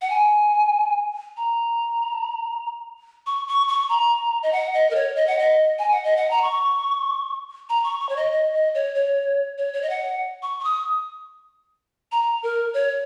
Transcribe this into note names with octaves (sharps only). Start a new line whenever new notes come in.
F#5
G#5
A#5
C#6
C#6
C#6
A#5
D#5
F#5
D#5
A#4
C#5
D#5
F#5
D#5
G#5
F#5
D#5
F#5
A#5
C#6
A#5
C#6
C#6
C#5
D#5
D#5
D#5
C#5
C#5
C#5
C#5
D#5
F#5
C#6
C#6
D#6
A#5
A#4
C#5